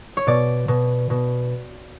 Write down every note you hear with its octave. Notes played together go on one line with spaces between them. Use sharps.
C#5
B2 D5
B2
B2